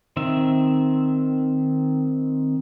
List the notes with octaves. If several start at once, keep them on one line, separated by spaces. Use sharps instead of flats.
D#3 C4 E5